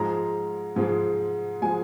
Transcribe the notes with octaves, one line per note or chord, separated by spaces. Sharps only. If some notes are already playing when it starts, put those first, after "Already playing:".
Already playing: G#2 F3 G#3 A#5
G#2 F3 G#3
F3 G#3 G#5